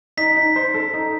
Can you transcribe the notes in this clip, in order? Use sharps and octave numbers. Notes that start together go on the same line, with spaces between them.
D#4 B6
D#4
C5
A4
D#4